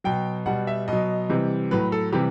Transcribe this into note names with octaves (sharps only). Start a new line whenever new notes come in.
B2 F#3 G5
B2 G3 F#5
E5
B2 F#3 D#5
C3 E3 G3
A2 F#3 B4
A4
C3 E3 G3 G4